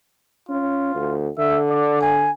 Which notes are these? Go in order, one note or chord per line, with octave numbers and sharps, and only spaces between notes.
C#4 F4
D2
D3 E5
D5
G#5